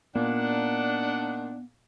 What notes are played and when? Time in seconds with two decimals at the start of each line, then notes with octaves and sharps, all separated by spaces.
0.15 A#2 A#3 B3 D4 D#4 F#5